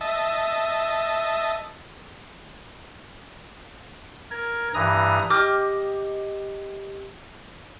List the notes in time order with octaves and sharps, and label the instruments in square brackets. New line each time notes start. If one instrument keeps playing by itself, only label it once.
[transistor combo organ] D#5 E5 A5
[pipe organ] A#4 G#6
G2 E3 A#5 D#6 A#6
[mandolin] G4 D#5 D6 F6